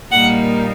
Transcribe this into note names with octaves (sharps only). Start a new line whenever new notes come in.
A#2 G3 A#3 D#4 F#5